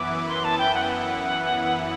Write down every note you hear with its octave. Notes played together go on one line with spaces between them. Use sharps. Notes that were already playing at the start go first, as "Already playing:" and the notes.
Already playing: F#2 E3 B3 E4 B4 D6
C6
A5
G5
F#5
G5
F#5